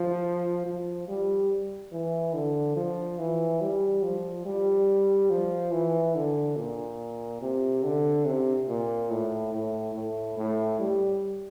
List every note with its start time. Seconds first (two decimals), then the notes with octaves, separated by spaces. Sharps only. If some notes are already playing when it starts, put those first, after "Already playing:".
Already playing: F3
0.66 F3
1.08 G3
1.92 E3
2.34 D3
2.76 F3
3.19 E3
3.61 G3
4.03 F3
4.45 G3
5.30 F3
5.72 E3
6.15 D3
6.56 A#2
7.42 C3
7.83 D3
8.25 C3
8.68 A#2
9.10 A2
9.53 A2
9.94 A2
10.37 A2
10.80 G3